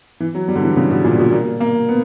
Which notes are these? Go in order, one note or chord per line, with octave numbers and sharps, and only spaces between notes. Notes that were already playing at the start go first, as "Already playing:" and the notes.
E3
F#3
G3
D3
E3
C#3
B2
A#2
B2
A#3
A#3
B3